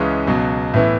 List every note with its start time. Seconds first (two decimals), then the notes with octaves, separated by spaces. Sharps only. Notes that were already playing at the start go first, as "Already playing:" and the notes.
Already playing: C#2 C#3 E3 G#3 C#4
0.27 C#2 B2 F#3
0.74 A2 E3 B3 E4